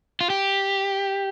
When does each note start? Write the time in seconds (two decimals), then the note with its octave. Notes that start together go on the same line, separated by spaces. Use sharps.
0.21 F4
0.30 G4